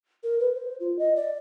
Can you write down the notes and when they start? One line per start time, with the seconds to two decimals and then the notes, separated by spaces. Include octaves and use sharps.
0.24 A#4
0.40 B4
0.55 C5
0.80 F4
0.99 D#5
1.16 D5